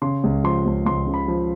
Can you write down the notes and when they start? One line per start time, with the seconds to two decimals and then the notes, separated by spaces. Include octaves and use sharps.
0.02 C#3 C6
0.24 C#2
0.44 F3 C6
0.66 C#2
0.86 C#2 C6
1.07 C#3
1.14 B5
1.28 F3